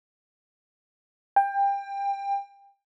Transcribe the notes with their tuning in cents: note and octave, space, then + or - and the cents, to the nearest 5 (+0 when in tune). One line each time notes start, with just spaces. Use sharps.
G5 +25